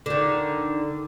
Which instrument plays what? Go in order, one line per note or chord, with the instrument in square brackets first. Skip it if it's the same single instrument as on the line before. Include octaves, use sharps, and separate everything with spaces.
[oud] D3 D#3